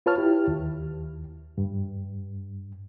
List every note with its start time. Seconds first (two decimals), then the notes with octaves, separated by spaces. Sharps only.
0.06 F4 B4 C#5 A5 F6
0.18 E4 G4
0.48 D#2
1.58 G2